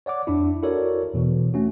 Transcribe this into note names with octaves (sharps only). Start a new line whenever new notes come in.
C#5 D5 F#5 D6
F2 D4 E4
E4 F#4 A4 A#4 C#5 D5
E2 B2 E3
A3 C#4 F#4